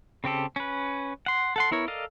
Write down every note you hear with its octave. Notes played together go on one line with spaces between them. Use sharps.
C#3 C4 G4 A4
C#4 B4
F#5 C6
A4 F#5 C6
B3 E4 A#4 C#5
A4 A#4 D5 D#5 F5